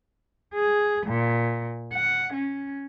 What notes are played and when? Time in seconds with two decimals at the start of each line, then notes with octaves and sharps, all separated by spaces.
0.54 G#4
1.07 A#2
1.94 F#5
2.33 C#4